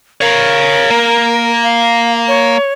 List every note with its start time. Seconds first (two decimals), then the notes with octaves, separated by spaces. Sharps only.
0.21 A#4 C#5 F5
0.90 A#3
1.63 F5
2.28 C#5